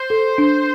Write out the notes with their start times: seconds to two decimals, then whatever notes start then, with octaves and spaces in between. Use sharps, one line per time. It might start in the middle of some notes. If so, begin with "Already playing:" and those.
Already playing: C5
0.10 A4
0.38 D4